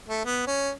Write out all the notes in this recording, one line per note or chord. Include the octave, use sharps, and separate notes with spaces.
A3
B3
C#4